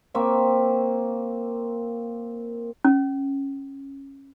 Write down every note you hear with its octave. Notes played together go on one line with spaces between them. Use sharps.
A#3 C4 E5 C#6
C#4